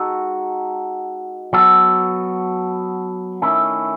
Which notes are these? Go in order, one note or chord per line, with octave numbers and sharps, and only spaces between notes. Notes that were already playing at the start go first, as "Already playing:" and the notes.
Already playing: G#3 D#4 F#4 A4
F#3 B3 F#4 A4
D#3 A3 C#4 E4